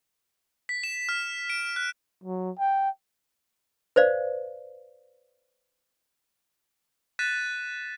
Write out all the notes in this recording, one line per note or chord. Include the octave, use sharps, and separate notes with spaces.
B6
E7
F6
D7
F#6
F#3
G5
B4 C5 D5 F5
F#6 A6 B6 D#7 E7